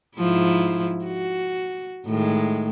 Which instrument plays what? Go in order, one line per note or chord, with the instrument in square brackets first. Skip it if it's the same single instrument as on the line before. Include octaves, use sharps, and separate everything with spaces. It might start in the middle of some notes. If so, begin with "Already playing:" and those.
[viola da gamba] G#2 F3 E4
F#4
A2 D#3 G#3